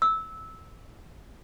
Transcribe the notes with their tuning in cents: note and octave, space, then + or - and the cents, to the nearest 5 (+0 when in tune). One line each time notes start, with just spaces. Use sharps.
E6 -15